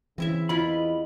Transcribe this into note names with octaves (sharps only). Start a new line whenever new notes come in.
C#3 E3 C4 E4 E5
E2 E4 F4 D#5 B5